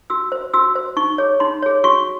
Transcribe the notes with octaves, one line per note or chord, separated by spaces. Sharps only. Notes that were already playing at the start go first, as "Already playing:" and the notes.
F#4 E6
C5
F#4 E6
C5
D#4 C#6
G#4 C#5
D#4 C6
G#4 C#5
F#4 C#6